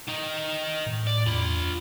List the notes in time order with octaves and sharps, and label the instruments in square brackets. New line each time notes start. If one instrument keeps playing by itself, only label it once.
[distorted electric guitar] D#3 D#4
[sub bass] A2
[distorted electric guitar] D5
[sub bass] E2 [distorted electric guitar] F4 B5